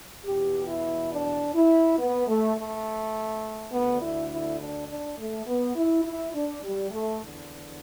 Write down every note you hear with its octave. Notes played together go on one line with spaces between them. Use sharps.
E2 B2 G4
E4
D4
E4
B3
A3
A3
D2 D3 B3
E4
E4
D4
D4
A3
B3
E4
E4
D4
G3
A3
E2 D3